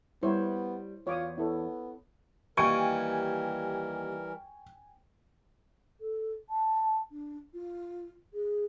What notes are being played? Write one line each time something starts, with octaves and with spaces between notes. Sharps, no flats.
G3 B3 E4 C5 C#5
E2 F4 C#5 D6 D#6
B3 E4 A4 C#5
D#2 E3 G3 A#4 G5 G#5 C#6
A4
A5
D4
F4
G#4